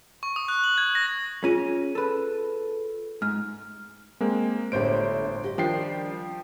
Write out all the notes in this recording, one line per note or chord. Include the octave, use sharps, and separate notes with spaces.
C#6
D#6
F#6
F#7
G#6
A#6
C#4 F4 G#4 D#7
A4 B4
G#2 F6
G#3 A#3 C4
G1 A2 D3 G4 C5 D7
G4 D#5
D#3 F3 G3 D4 G5 C7